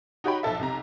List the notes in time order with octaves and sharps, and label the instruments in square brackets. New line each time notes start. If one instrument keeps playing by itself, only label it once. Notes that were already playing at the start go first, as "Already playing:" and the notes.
[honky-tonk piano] D#4 F#4 G4 C#5 G5 B5
B1 F3 A4 E5
B1 C3 A#5